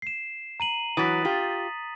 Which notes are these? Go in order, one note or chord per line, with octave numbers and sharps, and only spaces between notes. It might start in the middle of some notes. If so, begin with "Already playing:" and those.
C7 E7
A#5 D#7 F#7
E3 F#3 D#6 A6 B6
F4 G4